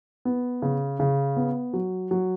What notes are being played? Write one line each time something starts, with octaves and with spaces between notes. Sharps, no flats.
B3
C#3
C#3
B3
F#3
F#3